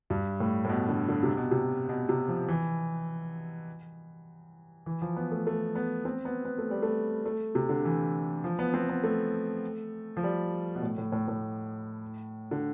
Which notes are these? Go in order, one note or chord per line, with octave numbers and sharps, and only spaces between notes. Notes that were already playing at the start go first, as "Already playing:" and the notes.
G2
A2
A2
B2
D3
D3
C3
B2
C3
B2
C3
F3
E3
E3
F3
B3
A3
A3
B3
C4
B3
B3
A3
G3
A3
A3
C3
D3
E3
F3
B3
C4
B3
A3
F3
G3
B2
A2
A2
A2
A2
D3